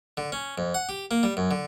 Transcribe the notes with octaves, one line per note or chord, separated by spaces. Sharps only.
D3
C#4
F2
F#5
G4
A#3
G3
F#2
D3